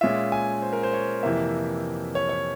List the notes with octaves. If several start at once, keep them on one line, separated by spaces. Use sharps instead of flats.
A#2 G#3 C#4 F4 E5
G#5
C5
A#4
C5
C#5
F2 C3 E3 A#3 E5
C#5
C#5